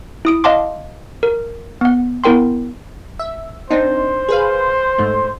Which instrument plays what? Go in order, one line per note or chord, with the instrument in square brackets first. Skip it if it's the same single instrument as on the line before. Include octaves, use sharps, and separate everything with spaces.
[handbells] E4 D#6 D7
D#5 F5 F#5 A5 C6 D6
A#4
B3 F#5
B3 E4 A#4 G5 C6
[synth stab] E5
[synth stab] C4 D4 D#4 [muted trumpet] C5
[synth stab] G#4 B4 F5
G#2 A3